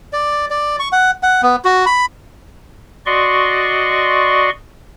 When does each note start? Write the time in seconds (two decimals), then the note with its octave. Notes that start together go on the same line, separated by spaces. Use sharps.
0.13 D5
0.51 D5
0.79 C#6
0.92 F#5
1.23 F#5
1.42 B3
1.65 F#4
1.86 B5
3.06 F#4 D5 D#5 C6 C#6